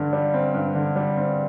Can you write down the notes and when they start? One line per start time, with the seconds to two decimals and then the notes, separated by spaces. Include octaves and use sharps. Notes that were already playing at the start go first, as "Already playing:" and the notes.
Already playing: G2 D3
0.13 G3
0.34 C4
0.54 G2
0.75 D3
0.96 G3
1.17 C4